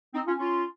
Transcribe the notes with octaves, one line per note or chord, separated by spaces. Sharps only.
C4 D#4
C#4 F4
C#4 F4